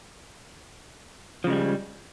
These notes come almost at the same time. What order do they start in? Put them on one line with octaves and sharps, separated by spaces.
F3 C#3 G#3 G3